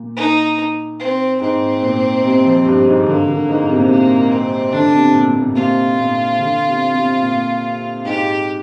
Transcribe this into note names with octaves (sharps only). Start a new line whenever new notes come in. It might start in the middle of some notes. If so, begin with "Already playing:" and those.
Already playing: A#2
D#4
C4
G#2 C4
A#2
C3
F3
G2
G#2
D3 A#3
D3
G#2
C3
A#2
C3 A#3
C4
D3 D4
C3
A#2
A#2
A#2
C3 F4
A#2
D3
C3
C3
A#2
G#2 G4